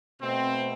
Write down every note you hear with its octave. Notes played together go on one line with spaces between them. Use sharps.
B2 A3 C4